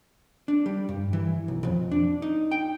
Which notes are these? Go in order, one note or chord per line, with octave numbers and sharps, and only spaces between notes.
D4
G3
G2
E3
B1
F2
D4
D#4
G5